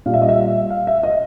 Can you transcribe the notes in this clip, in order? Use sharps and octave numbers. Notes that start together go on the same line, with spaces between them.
A#2 G3 F5
E5
D#5
E5
F5
E5
D#5